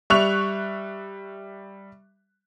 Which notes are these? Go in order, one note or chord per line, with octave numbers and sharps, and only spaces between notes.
G3 E5 C#6 F#6 F7